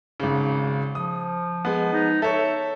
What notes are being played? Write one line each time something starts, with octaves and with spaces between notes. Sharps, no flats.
G#1 C#3
F3 D#6
G#3 B3
D#4
A4 C#5 E5